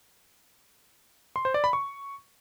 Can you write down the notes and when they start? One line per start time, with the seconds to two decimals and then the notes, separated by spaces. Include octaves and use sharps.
1.36 C6
1.45 C5
1.54 D5
1.64 B5
1.73 C#6